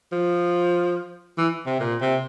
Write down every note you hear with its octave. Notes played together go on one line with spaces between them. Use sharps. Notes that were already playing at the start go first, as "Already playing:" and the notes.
F3
E3
C3
A#2
C3